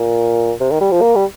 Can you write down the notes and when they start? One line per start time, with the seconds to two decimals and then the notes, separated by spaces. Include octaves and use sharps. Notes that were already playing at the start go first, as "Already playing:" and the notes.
Already playing: A#2
0.60 C3
0.71 D#3
0.81 G3
0.92 F3
1.02 A#3
1.16 G3